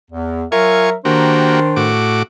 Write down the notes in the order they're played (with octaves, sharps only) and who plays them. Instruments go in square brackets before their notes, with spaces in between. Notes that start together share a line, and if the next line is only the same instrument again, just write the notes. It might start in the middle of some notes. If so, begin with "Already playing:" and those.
[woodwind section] E2
[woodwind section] F#3 A#4 E5 [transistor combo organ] F4 G#5 C#6
[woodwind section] D#3 D4 C5 [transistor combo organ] A#3 F#4 G4
[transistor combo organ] A2 F#4 D6